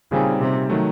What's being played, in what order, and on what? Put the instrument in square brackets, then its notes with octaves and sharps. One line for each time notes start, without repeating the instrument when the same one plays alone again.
[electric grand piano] A#2 G3 C4 D#4 [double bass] C#3
[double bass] C3
[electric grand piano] D#3 F#3 A3